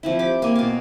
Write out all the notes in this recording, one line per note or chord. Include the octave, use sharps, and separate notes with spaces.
F3 C4 E4
G4 D6
A#3 G#5
B2 F5